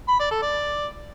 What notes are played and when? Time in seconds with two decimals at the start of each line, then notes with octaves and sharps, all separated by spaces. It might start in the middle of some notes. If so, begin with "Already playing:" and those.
0.08 B5
0.20 D5
0.31 A4
0.42 D5